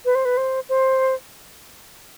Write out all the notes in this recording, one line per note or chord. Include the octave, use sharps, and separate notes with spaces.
B4
C5
B4
C5
C5